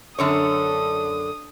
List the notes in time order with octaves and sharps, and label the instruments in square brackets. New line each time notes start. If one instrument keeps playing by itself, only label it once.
[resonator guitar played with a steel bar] F#2 D3 C#5 [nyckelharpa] D4 A4 [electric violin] D#6